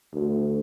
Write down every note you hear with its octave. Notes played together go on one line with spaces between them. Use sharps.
D2